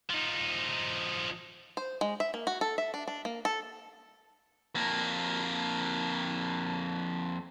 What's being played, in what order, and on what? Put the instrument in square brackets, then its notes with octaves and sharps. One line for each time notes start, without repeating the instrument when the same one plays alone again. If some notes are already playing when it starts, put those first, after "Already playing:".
[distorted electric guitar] F3 D#4
[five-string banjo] C5
G#3
E5
A#3
F#4
A4
E5
D4
D4
A#3
A4
[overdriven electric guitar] F2 A#3